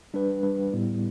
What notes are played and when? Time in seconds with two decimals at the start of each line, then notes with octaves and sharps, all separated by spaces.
0.14 G3 D4 B4
0.43 G3 D4 B4
0.73 A2 G3 B3 E4